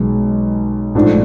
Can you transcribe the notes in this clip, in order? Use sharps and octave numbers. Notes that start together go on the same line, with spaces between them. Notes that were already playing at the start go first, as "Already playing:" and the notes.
Already playing: B1 B2 G#3
A#1 G#2 F3 A3 D4